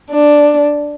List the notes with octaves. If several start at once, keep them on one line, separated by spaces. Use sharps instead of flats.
D4